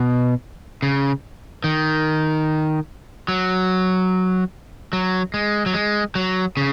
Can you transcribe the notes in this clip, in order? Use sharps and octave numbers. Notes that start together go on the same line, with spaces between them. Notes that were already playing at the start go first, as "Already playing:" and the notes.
Already playing: B2
C#3
D#3
F#3
F#3
G#3
F#3
G#3
F#3
C#3